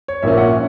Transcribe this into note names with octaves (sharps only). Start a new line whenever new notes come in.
C#5
A#1 A#2 A#3 C#4 E5
F#5